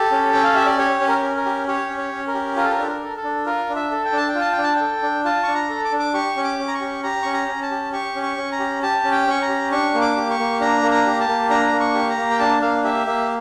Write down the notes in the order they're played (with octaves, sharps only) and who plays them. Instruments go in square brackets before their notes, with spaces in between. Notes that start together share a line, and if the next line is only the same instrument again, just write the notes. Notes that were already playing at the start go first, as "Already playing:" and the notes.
Already playing: [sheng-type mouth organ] G4 A4
C#4
C#4 G5
F5
G4 E5
D5
G4 C#5
C#4
A#4
C#4
A#4
G4
G4 C#5
C#4
C#5
C#4
A#4
G4
F4 A#4
A4
A#4
D4 A4
A#4
A4
A4
D4
F4 A#4
D4
E5
A4
G5
D4 A5
G5
F4
A5
G5
D4
A5
A4 G5
D4
F4 A5
D4 C#6
A#5
A4
D6
D4
D6
G4 C#6
C#4
D6
C#4
A#5
C#6
G4
G4 A#5
C#4 C#6
A#5
C#4
A5
G4
G4 C#6
C#4
C#6
C#4
A#5
G4
G4 A5
C#4
G5
C#4 C#6
A#5
G4
D4 C#6
A#3
D6
G4
C#6
A#3
D4 A#5
A#3
A#5
G4
A5
A#3
D4 A#5
A#3
C#6
G4
A#5
A#3
G5
D4 A5
A#3 F5
G4 E5
A#3 E5